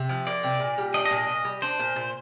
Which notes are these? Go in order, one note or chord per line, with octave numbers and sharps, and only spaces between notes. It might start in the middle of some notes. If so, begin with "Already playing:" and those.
Already playing: C3
F3
A#3 D5
C3
A#2
G3
D4 D#5
D#5
A#2
D#5
A#2
G3
D4 C5
A#2
A#2